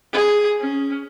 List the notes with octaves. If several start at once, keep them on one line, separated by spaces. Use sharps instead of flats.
G#4
C#4